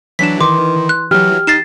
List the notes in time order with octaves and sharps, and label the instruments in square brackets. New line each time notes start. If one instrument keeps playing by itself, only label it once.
[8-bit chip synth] E3 F#3 D4 [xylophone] B6 E7
[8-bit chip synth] D#3 [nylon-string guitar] E3 [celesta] C6 [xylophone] D6
[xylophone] F#6
[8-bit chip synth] E3 F#3 [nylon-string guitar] G4 [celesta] F6
[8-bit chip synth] D#4 [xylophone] A6 C7 E7